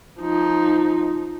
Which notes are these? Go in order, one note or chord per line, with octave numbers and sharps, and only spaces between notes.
F3 D#4